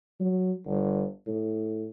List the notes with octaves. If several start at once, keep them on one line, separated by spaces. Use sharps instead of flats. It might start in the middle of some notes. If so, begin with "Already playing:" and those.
F#3
G1
A2